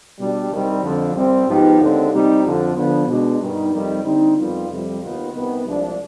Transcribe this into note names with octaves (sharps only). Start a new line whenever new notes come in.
B2 G3 D4 G4
C2 C3 D#3 G3 C4
F2 D3 F3
C2 C3 G3 C4
G#2 F3 B3 D#4 G4
D#2 D3 G#3 C4
C3 G3 C4 D#4 G4
F2 D3 F3
D3 F3 B3
B2 G#3 D4
G2 D#3 G3 B3 D#4
F2 C3 D#3 G3
D3 G3 C4 D#4
F2 D#3 G3 B3 F4
F2 C3 G3
D#2 D#3 B3 F4
C2 C3 D#3 B3
C2 C3 F3 G#3 D4